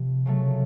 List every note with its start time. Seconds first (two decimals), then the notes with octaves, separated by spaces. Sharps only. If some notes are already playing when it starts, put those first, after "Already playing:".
Already playing: C3 F3
0.26 C#3 F#3 A3